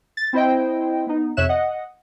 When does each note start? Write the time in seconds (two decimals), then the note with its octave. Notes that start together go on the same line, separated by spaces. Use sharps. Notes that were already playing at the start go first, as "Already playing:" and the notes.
0.17 A6
0.33 C4 E4 C5 D#5 G5
1.07 B3 D#4
1.37 F2 C3 C#5 E5 F#6 E7
1.49 D#5 F#5 D#6